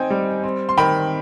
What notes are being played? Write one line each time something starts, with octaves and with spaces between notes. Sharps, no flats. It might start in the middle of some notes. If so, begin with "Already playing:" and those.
Already playing: C4 D#4 G5 G#5
G3
C4
C6
D#3 G5 B5